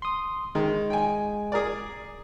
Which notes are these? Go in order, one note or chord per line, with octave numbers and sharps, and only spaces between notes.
C6 D#6
D#3 G#3
G5 G#5
G#4 A#4 D5